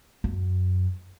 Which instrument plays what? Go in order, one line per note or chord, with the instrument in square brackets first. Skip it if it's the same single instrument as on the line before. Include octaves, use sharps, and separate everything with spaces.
[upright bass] F#2